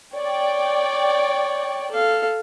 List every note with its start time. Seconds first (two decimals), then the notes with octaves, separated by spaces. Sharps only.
0.15 C#5 D5 G5
1.91 A4 F5